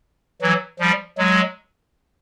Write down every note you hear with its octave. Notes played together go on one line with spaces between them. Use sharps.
E3 F#3
F3 G3
F#3 G#3